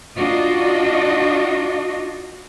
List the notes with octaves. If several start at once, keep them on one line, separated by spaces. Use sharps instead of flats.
D4 D#4 F4 F#4 D#5